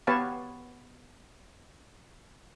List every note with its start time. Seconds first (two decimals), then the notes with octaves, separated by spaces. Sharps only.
0.07 B3 G4 B4 C#5 F5 A5